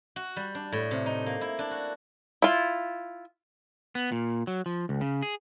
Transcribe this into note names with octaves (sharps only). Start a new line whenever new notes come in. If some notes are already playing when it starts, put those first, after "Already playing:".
F#4
G3
D4
A2
C3
D#4
A#3
E4
D4
F#4
E4 F4
B3
A#2
F#3
F3
C#2
C#3
G#4